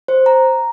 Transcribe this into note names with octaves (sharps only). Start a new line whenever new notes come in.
C5
A#5